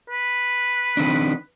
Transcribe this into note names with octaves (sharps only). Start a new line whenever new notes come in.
B4
D#3 C4 D4